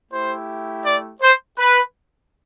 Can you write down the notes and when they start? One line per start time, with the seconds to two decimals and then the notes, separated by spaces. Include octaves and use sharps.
0.11 A3 E4 G4 C5
0.85 D5
1.21 C5
1.58 B4